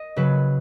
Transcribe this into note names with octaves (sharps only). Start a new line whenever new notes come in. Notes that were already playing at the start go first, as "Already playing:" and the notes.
Already playing: D#5
C#3 F#3 B4